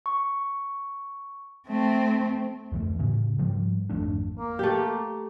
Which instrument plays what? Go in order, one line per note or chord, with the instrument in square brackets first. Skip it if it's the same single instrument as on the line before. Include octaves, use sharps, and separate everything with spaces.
[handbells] C#6
[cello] A3 C4
[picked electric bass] F2 E3 A3
A2 C#3 C#4
G#2 F3 G3
G#1 F2 A3 D4
[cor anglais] A#3
[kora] A3 G4